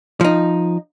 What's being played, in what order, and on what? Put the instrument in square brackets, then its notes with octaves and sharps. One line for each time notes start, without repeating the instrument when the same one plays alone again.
[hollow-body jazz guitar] F3 D#4